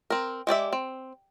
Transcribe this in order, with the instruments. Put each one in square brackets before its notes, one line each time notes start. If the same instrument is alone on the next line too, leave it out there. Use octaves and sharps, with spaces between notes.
[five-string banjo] C4 A#4
G#3 G4 D5 E5
C4